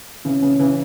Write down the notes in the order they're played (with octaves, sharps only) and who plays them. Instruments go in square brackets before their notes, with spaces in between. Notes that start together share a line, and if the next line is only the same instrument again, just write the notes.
[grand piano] C#3 E3 [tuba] C#4
[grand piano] C#3 E3
C#3 E3